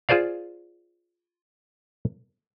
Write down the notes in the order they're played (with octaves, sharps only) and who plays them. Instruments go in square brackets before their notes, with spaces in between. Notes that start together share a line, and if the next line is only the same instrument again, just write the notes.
[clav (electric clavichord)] F4 G#4 C5 D5 F5